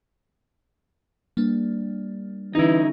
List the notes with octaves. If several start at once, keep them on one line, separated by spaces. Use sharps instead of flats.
G3 A#3 D4
D3 E3 C#4 D#4 E4 G4